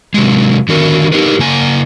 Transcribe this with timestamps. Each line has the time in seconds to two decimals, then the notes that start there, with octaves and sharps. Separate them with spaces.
0.14 C3 F#3 G#3
0.69 D3 D#3 F#4 A#4
1.12 D#4 G4 G#4 A#4 B4
1.39 C#3 A#3 G#5